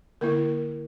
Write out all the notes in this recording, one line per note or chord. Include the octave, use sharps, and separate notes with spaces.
D3 A#3 E4 A#4